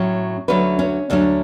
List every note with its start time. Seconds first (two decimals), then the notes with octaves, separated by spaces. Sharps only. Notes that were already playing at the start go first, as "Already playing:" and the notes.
Already playing: A2 F#3 C#4
0.48 D2 D3 F#3 A3 C#4 B4
0.79 C#4
1.10 D2 D3 F#3 A3 C#4 D4